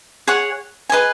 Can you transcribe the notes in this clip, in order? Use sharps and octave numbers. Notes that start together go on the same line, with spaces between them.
G#4 C#5 F#5
G#4 B4 D#5 G#5